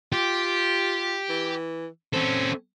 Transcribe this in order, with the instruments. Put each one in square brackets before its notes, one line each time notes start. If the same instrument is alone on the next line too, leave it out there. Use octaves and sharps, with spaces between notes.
[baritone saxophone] F4 [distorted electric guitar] G4
[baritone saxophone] E3
[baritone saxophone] C4 [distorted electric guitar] C#4 A4